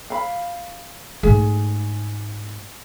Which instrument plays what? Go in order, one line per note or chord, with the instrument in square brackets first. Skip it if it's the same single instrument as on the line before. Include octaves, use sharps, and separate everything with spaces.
[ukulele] F5 B5
[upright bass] G#2 A3 [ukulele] G#4